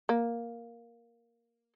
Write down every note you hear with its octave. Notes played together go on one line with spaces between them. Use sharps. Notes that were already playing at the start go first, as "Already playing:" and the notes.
A#3